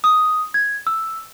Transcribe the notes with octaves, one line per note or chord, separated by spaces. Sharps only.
D#6
G#6
E6